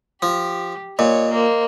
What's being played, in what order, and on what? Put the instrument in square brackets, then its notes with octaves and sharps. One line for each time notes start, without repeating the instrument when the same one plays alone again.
[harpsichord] F3 [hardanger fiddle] G4
[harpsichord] A#2 [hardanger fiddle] C#5 [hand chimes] D#5
[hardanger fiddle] A#3 C5 [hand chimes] D#5